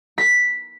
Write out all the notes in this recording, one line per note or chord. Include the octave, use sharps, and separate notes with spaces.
B6